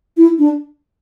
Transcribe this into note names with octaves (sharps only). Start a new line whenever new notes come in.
E4
D4